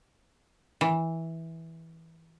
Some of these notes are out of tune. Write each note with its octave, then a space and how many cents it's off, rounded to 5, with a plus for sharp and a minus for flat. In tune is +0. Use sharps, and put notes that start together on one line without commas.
E3 -10